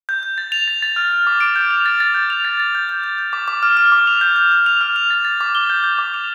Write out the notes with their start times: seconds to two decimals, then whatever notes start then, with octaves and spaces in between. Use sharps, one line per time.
0.09 G6
0.23 G6
0.38 A6
0.52 F7
0.68 A6
0.82 A6
0.96 F6
1.11 F6
1.27 D6
1.41 D7
1.56 G6
1.71 F7
1.86 A6
2.00 A6
2.14 G6
2.30 F7
2.45 A6
2.60 A6
2.75 G6
2.89 G6
3.04 G6
3.18 G6
3.33 D6
3.48 D6
3.63 F6
3.77 F6
3.92 D6
4.07 F7
4.21 G6
4.36 G6
4.52 G6
4.66 F7
4.81 F6
4.96 F7
5.10 A6
5.25 A6
5.41 D6
5.55 G7
5.70 G6
5.84 G6
5.99 D6
6.14 F7